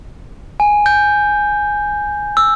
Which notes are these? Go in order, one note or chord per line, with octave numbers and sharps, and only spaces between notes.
G#5
G6
E6